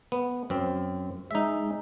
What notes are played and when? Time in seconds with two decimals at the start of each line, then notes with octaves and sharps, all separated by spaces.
0.12 B3
0.50 F#2 C4
1.31 G#3 D#4 E5